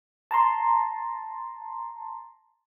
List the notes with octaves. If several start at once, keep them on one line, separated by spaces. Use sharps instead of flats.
A5 A#5 C6